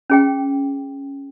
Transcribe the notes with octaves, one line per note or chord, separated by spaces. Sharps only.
C#4 G#4 G5